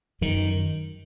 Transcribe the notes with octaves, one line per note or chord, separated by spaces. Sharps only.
F#2 D#3